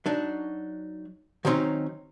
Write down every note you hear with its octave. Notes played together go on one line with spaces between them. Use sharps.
F#3 D4 D#4
D#3 F#3 G3 C4 C#4 D#4